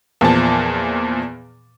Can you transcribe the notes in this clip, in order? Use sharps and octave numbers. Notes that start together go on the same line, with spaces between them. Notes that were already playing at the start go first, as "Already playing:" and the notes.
E2 A#2 F3 A5